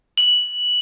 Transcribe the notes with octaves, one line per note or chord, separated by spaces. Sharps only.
F#7